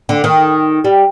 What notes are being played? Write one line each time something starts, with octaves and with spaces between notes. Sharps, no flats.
D3
D#3
G3